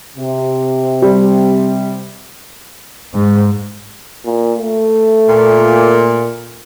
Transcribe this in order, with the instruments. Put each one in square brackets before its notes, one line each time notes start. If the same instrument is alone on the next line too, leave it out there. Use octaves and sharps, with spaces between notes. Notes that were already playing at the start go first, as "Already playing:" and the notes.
[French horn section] C3
[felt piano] G3
[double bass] G#2
[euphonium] A#2
A3
[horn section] A#2